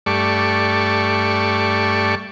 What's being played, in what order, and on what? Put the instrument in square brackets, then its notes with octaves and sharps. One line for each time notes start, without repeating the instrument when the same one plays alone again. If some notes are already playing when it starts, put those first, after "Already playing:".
[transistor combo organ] G2 A3 D5 C#6